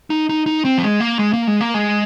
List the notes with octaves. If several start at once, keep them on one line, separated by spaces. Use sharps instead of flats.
D#4
D#4
D#4
C4
F3
G#3
A#3
G#3
A#3
G#3
A#3
G#3